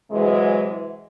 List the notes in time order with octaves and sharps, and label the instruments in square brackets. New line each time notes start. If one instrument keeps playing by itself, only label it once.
[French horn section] C3 E3 F#3 G#3